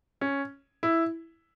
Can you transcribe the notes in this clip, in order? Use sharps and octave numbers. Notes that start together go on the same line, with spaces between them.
C#4
E4